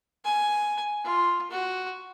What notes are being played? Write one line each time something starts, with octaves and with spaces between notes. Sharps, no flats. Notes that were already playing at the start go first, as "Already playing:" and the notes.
G#5
F4
F#4